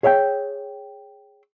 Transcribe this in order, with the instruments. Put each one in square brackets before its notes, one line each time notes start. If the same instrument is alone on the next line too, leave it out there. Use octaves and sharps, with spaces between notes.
[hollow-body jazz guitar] G#4 C#5 E5 F#5 G5